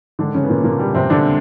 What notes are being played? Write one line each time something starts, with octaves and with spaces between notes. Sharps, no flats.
G#2 D3 D#3 D4
C#3 C#4
B3
A#2 A#3
A#2 A#3
G3
C3 C4
D3 D4